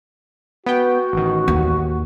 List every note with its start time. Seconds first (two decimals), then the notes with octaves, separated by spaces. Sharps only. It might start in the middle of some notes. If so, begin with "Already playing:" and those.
0.66 B3 F#4 G5
1.13 A1 D#3
1.48 D#2